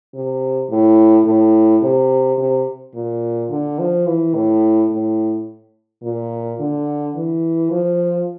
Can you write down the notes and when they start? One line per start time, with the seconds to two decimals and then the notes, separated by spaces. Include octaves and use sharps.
0.14 C3
0.70 A2
1.26 A2
1.82 C3
2.38 C3
2.95 A#2
3.50 D3
3.79 F3
4.07 E3
4.35 A2
4.91 A2
6.03 A#2
6.60 D3
7.16 E3
7.71 F3